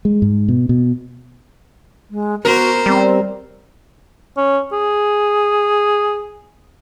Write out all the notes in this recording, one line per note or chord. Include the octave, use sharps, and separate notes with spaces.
G#3
G#2
B2
B2
G#3
B3 F#4 A#4 C5
G3 C4
C#4
G#4